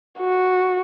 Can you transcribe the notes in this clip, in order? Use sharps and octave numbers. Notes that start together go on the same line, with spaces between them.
F#4